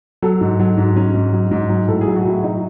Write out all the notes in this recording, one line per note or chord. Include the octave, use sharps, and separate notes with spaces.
F#3 A4
G#2
F#3
G#2
F#3 C#4
G#2
F#3
G#2
F#3
A2 A4
G#4
F#3
F#4
A2
E4
F#3 D#4